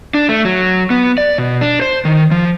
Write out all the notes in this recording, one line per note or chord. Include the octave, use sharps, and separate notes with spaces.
D4
A3
F#3
B3
D5
B2
D4
C5
D#3
F3